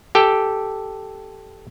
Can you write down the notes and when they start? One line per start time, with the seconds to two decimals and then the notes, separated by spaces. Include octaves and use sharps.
0.15 G4 A4 G5